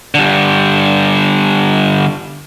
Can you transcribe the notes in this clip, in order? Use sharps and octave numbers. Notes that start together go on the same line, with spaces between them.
D3 G3